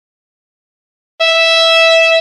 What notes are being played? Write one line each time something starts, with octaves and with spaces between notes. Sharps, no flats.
E5